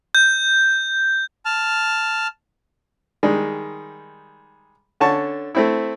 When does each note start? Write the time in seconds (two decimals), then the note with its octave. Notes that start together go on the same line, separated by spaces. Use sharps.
0.15 G6
1.45 A5 F6
3.23 D#3 G3 G#3
5.00 D3 C#4 A5 C#6
5.55 A3 C4 E4